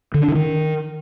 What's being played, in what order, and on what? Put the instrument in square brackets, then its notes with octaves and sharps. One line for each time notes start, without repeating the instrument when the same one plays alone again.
[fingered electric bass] D3
D4
D3
D#3